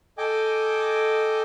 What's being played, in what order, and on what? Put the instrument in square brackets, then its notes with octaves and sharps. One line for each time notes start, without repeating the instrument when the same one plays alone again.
[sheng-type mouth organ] A4 D#5 G5 G#5 D6